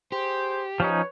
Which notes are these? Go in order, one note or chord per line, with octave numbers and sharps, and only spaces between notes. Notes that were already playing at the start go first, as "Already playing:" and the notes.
G4 G#4 C5
F3 C#4 D#4 B4 C#5